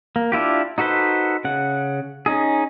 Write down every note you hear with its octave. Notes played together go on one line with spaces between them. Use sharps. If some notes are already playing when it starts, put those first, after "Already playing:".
A#3
D4 E4 F4 G4
D#4 F#4 A4 B4 C5
C#3 F#5
C#4 D#4 G#4